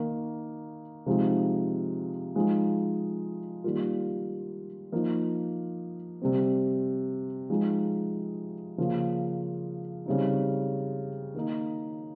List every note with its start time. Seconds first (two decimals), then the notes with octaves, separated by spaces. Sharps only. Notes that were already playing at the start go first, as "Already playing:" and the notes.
Already playing: D#3 A#3 D#4
1.06 C3 F3 G#3 D#4
2.36 F3 G#3 D#4
3.64 D#3 G3 A#3 F4
4.92 F3 A#3 D#4
6.21 C3 G3 C4
7.50 F3 G#3 D#4
8.78 C#3 F3 A#3
10.06 C#3 G3 C4 D#4
11.34 D#3 A#3 D#4